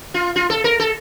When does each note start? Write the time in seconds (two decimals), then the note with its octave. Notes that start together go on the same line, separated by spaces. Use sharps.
0.14 F4
0.36 F4
0.50 A4
0.64 A#4
0.80 A4